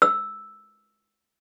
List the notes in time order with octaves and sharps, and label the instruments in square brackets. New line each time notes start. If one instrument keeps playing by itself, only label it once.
[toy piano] E6